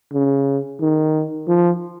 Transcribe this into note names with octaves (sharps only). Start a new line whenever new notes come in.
C#3
D#3
F3